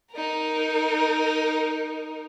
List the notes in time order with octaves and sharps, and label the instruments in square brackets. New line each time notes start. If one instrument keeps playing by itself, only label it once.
[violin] D#4 A#4